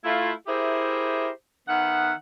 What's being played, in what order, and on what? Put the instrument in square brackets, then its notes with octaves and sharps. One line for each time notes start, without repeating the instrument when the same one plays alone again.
[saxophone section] A3 E4 F4
E4 G4 G#4 A#4 C5 E5
D#3 B3 E5 F#5